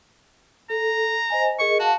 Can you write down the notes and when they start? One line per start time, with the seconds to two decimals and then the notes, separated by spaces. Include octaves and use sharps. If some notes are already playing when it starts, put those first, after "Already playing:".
0.70 A4 A#5
1.30 C5 D#5 G#5
1.59 G#4 A#4 D#5 C#6
1.80 F#4 F5 A5